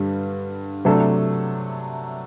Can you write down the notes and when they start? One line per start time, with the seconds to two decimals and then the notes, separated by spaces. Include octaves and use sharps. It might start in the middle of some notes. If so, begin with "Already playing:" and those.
Already playing: G2 D3 G3
0.85 C3 F#3 A3 D4 A4